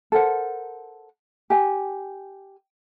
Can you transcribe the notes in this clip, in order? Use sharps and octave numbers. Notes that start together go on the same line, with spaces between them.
A4 A#4 C5 F#5
G4 G#5